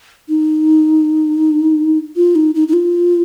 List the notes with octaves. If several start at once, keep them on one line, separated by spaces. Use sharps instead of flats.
D#4
F4
D#4
D#4
D#4
F4